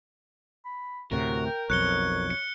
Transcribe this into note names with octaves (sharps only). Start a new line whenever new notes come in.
B5
D2 A2 C3 F#4 A#4
G5
B1 F2 C#5 F#6 C#7 G7
C#7